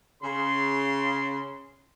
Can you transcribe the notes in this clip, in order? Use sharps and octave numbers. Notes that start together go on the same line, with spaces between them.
C#3 C6